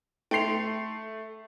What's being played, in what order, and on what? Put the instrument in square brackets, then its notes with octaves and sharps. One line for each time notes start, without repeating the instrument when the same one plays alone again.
[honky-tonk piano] A3 C7 [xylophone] G5 C6 F7